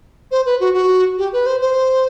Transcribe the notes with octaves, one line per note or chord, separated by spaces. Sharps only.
C5
B4
F#4
F#4
G4
B4
C5
C5